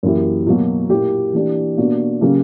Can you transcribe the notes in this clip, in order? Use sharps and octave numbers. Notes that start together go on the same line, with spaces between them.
F#2 E3 A#3 E4 G4
B2 F#3 A#3
A#2 A#3 E4 G4
E3 A#3 D4 G4
B2 A#3 D4 F#4
C#3 F#3 A#3 C#4 G4